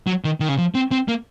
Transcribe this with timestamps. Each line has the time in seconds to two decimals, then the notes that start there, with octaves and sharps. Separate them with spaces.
0.07 F#3
0.24 D#3
0.40 D#3
0.49 C#3
0.58 F3
0.75 C4
0.92 C4
1.08 A#3